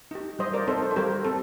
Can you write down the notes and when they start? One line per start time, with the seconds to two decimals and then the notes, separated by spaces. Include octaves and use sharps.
0.11 D#4 G4
0.39 G3 C5 D#5
0.54 A#4 D5
0.67 C4 D#4 A4 C5
0.82 A4
0.91 C5
0.96 G3 G4 A#4
1.25 C4 A4